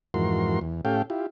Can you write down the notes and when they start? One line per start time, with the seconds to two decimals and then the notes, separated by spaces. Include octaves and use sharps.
0.14 F2 G#2 E3 F#4 A#4 C6
0.61 E2
0.85 A2 C#4 G4 A4 F5 G5
1.10 E4 F4 G4